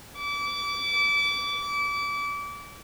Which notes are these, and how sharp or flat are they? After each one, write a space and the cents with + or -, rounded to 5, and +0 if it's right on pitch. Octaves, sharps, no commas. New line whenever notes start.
D6 -30